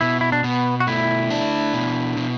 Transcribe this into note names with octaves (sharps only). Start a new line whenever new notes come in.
B2 E4
E4
D4
B2 B3
F#4
A3 E4
D4
B2
B2